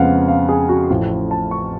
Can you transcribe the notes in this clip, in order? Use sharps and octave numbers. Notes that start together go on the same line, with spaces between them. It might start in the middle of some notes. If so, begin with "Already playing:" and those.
Already playing: F2 C#3 F3 G#3 B3 F5 F#5
F5
G#4
F#4
A1 A2 F3
A5
C#6